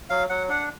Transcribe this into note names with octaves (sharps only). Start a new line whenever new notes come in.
F#3 F5
F#3 F#5
D4 F#5